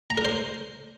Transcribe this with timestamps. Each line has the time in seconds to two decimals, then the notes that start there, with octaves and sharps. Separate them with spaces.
0.10 A#5
0.18 A#4
0.25 C5